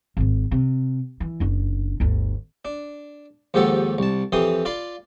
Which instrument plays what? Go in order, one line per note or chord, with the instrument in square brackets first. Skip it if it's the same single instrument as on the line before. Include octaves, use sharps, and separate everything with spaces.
[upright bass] G#1 G#2
C3
E3
F#1 D4
G1 D2
[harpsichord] D4
D#2 G#2 F3 G4 A4 F#5
C2 A5
F2 E3 G4 C6 D#6
F4 D5 B5 C6